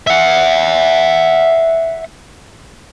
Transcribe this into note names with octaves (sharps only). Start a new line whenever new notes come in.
E5 F#5